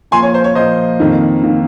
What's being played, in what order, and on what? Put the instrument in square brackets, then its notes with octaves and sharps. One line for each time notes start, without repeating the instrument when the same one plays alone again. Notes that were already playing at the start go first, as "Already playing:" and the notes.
[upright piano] A#2 F3 A#3 [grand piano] G#5 C6
[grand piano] C#5
C5
C#5
[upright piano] A#2 F3 A#3 [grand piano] C5 D#5
[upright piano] F2 D#3 A#3
D#3 A#3